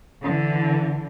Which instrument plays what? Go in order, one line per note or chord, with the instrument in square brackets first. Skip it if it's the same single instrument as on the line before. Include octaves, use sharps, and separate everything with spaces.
[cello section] D3 E3